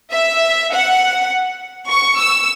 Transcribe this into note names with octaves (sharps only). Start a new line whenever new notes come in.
E5
F#5
C#6
E6